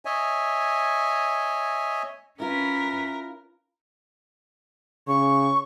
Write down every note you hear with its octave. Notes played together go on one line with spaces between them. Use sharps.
C#5 D#5 E5 G#5
C#4 E4 F4 A#4 B4
C#3 C#6